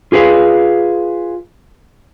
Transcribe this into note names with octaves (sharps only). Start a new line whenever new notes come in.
F4 G#4 B4 F5